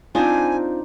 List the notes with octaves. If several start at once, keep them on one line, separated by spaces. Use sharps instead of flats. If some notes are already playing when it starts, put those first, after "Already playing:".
C4 D4 D#4 F4 C5 G#5